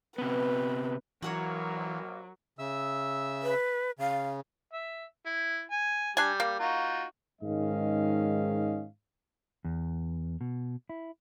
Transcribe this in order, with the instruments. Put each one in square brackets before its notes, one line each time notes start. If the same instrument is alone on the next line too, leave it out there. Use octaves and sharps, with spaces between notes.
[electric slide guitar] C3 B3 [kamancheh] B4
[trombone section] A#1 A#3 [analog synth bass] E3 [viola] F#3 [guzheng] F#4 A#4 C#5
[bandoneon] C#3 E5 E6
[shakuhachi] B4
[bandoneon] C#3 [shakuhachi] F5
[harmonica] E5
E4
G#5
[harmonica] G3 [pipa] D4 G#5
[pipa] A#3
[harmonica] D#4 F4 F#4
[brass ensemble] G#2 D#3 G#3 C#4 D#5 F5
[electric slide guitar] E2
B2
E4